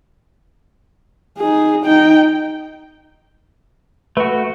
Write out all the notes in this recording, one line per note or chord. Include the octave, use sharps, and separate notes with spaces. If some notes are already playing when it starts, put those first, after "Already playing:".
D#4 G#4
D#4 G5
A3 F#4 B4